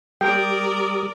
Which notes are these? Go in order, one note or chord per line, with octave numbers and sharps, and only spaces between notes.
G3 G4 A#4 D5 G5 D#6